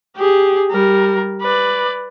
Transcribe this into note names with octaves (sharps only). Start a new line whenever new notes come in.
G4 G#4
G3 A#4
B4 D5